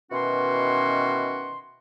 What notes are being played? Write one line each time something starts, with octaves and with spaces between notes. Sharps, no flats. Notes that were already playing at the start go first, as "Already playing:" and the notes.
B2 D#3 E3 C#4 F#4 C6